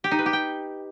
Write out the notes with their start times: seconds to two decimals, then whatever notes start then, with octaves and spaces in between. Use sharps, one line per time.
0.04 G4
0.11 D#4
0.19 B4
0.26 G4
0.33 G5